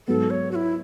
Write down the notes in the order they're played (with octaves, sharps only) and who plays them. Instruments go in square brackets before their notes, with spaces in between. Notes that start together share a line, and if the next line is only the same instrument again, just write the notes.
[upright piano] G#2 F#3 B3 [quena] A4
[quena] C#5
F#4
E4